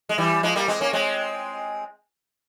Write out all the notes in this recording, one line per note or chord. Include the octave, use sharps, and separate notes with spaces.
G#3
E3 G3
F3 G#3
G3 A#3
G#3 C4
A#3 C#4
G#3 C4